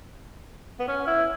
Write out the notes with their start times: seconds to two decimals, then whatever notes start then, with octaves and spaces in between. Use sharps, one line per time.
0.80 B3
0.88 C#4
1.07 E4